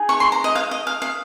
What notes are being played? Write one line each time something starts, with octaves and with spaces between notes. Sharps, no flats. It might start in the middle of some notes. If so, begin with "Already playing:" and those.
Already playing: D#4 G#4
C#6
C6
A#5
D#5
F5
D#5
F5
F5